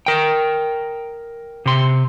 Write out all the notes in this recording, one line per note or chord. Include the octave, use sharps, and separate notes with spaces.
A#4 G5
C3 C6